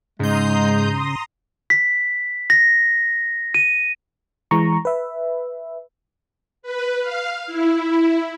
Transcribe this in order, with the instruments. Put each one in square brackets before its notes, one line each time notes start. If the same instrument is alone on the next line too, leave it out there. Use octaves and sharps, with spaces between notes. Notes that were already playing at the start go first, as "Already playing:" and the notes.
[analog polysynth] G#2 G6 [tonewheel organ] C#3 [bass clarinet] G#3 [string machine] A#5 C6 D#6
[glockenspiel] B6
A#6
D#7
[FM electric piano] E3 G#3 A#5 C#6
B4 E5
[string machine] B4
F5
E4